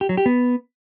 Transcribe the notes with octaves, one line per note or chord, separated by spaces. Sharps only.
G4
F#3
G4
B3